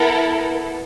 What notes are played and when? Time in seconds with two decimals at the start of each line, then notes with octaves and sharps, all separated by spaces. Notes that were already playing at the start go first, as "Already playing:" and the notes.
Already playing: B3 E4 A4 A#4